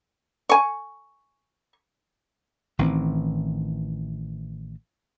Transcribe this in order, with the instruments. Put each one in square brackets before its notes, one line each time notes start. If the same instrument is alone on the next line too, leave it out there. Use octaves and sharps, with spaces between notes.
[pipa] G#5 C#6
[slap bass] A1 D#3 E3 C4